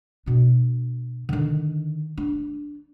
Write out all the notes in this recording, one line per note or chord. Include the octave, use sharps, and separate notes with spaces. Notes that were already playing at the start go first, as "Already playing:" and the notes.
B2 D4
D3 D#3
D4